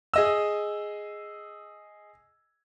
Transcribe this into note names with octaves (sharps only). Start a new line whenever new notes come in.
G#4 D#5 E6